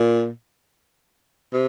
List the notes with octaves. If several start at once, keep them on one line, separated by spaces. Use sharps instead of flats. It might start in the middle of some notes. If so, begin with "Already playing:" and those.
Already playing: A#2
C3